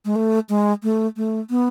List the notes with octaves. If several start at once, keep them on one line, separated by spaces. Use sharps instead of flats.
G#3
A3
G#3
A3
A3
B3